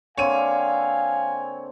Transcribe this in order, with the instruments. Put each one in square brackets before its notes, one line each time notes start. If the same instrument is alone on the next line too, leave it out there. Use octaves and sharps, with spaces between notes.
[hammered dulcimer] D3 A#3 C4 [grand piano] C#5 D#7 [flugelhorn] F5 [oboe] G#5